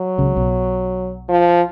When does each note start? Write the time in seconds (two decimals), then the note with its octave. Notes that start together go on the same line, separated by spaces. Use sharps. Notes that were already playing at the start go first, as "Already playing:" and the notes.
Already playing: F#3
0.18 C#2 C#3
0.36 B1 B2
1.28 F3